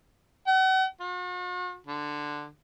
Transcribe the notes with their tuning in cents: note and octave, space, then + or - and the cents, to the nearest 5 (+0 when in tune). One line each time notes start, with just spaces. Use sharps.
F#5 +40
F#4 -45
D3 +10